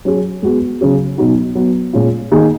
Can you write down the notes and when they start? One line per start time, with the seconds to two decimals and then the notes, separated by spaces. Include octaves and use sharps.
0.05 F#3 C#4 G#4
0.42 G#3 B3 F#4
0.81 C#3 F#3 C#4 G#4
1.18 B2 F#3 B3 D#4 F#4
1.55 F#3 B3 F#4
1.93 A#2 G#3 C#4 F4
2.31 D#3 A#3 D#4 G#4